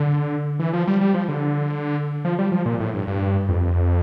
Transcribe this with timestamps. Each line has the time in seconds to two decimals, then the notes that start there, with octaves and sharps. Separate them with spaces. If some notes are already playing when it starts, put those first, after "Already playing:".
Already playing: D3
0.59 E3
0.73 F3
0.87 G3
1.01 G3
1.14 F3
1.28 D3
2.25 F3
2.39 G3
2.52 F3
2.66 A#2
2.80 A2
2.94 G2
3.07 G2
3.49 F2